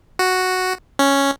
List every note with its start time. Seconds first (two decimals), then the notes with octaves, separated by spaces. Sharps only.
0.19 F#4
0.99 C#4